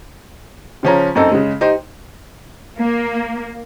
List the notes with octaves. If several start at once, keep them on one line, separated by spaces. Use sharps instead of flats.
C#3 F3 C#4 A#5
F#2 C4 D#4 A4
C#3 G#3
D#4 G4 C5
A#3